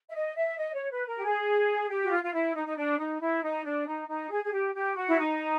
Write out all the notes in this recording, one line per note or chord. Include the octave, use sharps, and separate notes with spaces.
E5
D#5
E5
D#5
C#5
B4
A#4
G4
G#4
G4
F#4
F4
F4
E4
D#4
D#4
D4
D#4
E4
D#4
D4
D#4
D#4
G#4
G#4
G4
G4
F#4
E4
D#4